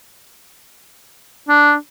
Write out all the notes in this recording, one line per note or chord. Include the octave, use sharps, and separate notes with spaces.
D4